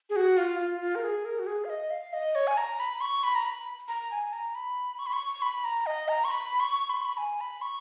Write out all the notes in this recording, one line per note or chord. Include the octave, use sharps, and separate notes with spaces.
G#4
F#4
F4
F4
F4
A#4
G#4
A#4
F#4
G#4
F5
D#5
F5
D#5
C#5
G#5
A#5
B5
C#6
B5
A#5
B5
A#5
G#5
A#5
B5
C#6
B5
C#6
B5
A#5
D#5
A#5
C#6
B5
C#6
B5
C#6
B5
G#5
B5
C#6